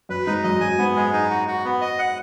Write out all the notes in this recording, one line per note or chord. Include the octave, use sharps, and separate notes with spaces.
F#2 B4
G#2 D#4
F#2 D#5
F#2 G#5
G#2 B3
G#3
D#4
F#4
F#4
B3
D#5
F#5